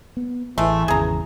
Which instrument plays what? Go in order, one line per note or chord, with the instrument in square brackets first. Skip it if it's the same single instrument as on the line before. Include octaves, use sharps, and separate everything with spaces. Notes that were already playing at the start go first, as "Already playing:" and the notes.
[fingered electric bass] B3
[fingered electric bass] A1 [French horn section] E3 [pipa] G#3 A3
[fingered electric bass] G#1 E2 C#3 [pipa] G#4 A#5